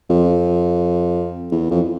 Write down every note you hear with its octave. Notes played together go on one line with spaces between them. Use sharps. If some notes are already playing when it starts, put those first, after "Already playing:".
F2
E2
F2